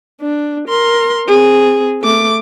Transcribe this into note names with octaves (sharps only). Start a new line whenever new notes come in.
D4
A#4 C6
C4 G#4
A3 D6